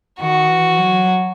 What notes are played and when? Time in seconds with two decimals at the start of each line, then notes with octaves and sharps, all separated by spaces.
0.20 D#3 F#4
0.48 E3
0.78 F#3